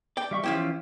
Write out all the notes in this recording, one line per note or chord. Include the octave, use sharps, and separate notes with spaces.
D5 G5
G3 E5 C#6
E3 F3 C#4 E4 F4 G4